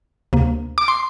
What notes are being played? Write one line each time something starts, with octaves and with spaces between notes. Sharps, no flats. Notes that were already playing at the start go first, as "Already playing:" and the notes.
D2 C3 A#3
D6
C6